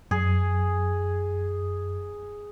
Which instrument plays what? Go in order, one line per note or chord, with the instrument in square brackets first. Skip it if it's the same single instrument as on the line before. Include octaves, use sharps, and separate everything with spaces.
[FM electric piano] F#2 [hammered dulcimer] G#4